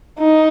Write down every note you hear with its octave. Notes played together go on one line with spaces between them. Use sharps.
D#4